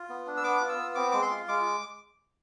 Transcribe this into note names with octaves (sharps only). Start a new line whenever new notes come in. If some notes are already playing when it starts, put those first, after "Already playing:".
Already playing: F4
B3
D4
E6
B3 D6
F4
E6
B3
C4 D6
G#3 D6
C6
F4
G#3 D6